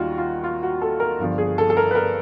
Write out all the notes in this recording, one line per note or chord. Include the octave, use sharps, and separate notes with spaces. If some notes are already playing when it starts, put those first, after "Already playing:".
Already playing: D#2 D#3 G3 F4 F#4
F4
F4
F#4
A4
A#4
G1 G2 D3 F3
G#4
A4
A4
A#4
B4
A#4